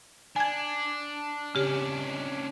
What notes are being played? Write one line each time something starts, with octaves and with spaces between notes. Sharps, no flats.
D4 G#5 G#6
C#3 C#4 D4 G4